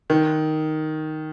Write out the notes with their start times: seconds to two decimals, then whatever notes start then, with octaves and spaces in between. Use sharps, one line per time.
0.10 D#3